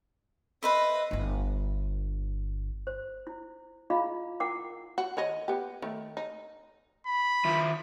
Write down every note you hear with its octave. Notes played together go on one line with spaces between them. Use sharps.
B4 C5 D#5 E5
G1 E4
C5
E4
E4 F4 G#4 D#5 F5 B5
E4 A#4 F#5 G5 D6
F#4
D#3 C#5 D#5
B3 G4
D#3 A3
D#4
B5
D#3 E4 F4